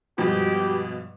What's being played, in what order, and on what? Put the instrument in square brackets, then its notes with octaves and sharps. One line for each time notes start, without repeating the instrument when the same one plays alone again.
[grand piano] G2 F3 G#3 [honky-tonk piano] B2 [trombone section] G4